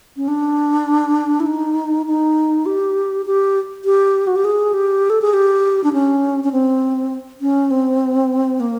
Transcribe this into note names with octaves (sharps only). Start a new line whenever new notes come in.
C#4
D4
E4
D#4
D#4
G4
G4
G4
F#4
G4
G#4
G4
A4
G#4
G4
D4
C#4
C#4
C4
C#4
C4
A#3